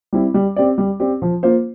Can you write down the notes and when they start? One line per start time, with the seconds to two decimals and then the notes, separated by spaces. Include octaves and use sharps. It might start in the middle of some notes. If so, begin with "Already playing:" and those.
0.13 G3 C4 E4
0.34 G3
0.56 C4 G4 D5
0.78 G3
1.00 C4 G4 D5
1.22 F3
1.43 A#3 F4 C5